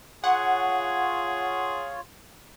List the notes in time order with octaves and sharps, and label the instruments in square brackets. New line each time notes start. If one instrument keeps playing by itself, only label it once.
[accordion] F4 C#5 [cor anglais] G#4 [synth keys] F#5